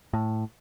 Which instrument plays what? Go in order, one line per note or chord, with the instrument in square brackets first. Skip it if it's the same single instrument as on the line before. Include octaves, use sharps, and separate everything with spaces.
[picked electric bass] A2